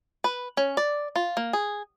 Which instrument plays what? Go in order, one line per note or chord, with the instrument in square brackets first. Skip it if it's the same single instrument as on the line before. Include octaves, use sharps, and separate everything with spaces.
[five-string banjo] B4
C#4
D5
F4
A#3
G#4